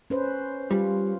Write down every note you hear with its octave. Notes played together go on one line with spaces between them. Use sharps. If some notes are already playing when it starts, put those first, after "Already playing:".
C#4 B4 C5
G3 F4